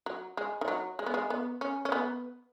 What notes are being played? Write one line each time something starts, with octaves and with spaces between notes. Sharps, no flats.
F#3
G#3
D#3
F#3
G#3
B3
G#3
B3
C#4
C#4
B3